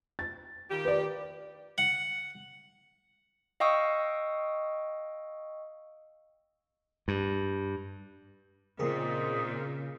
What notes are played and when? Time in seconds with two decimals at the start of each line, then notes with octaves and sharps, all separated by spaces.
0.19 A6
0.71 D#3 F4 G4
0.85 B4 D5
1.78 F#5
3.60 D#5 F5 G5 C#6 D#6 E6
7.08 G2
8.79 A#2 C#3 C4 D#4 G#4 A#4 D#5